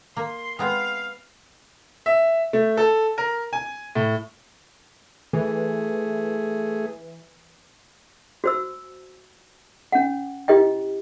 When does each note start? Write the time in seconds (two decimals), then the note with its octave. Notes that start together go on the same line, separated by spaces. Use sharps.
0.17 A#3 C6
0.59 G#3 B3 C4 F5
2.06 E5
2.53 A3
2.77 A4
3.18 A#4
3.53 G#5
3.95 A2
5.33 E3 A3 G#4
8.44 F#4 C5 E6
9.92 C#4 F#5
10.48 E4 G4 D#5 G5